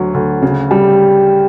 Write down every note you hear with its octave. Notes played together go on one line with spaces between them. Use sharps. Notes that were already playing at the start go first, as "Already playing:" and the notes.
Already playing: D2 F#3
D2
C#3
G3